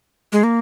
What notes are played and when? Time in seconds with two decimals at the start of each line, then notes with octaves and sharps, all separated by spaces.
0.32 G#3
0.43 A#3